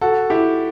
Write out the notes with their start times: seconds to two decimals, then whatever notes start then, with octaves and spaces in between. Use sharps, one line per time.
0.01 F#4 A4
0.30 E4 G4